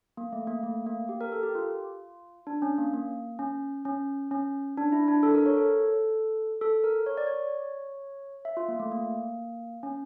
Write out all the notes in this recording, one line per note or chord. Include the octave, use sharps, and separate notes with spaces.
A#3
A3
A#3
A3
A#3
G4
A#4
A4
G4
F4
D4
C#4
A#3
A#3
C#4
C#4
C#4
D4
E4
D4
A4
A#4
C#5
A4
A4
A#4
C#5
D5
C#5
E5
F4
A#3
A3
A#3
C#4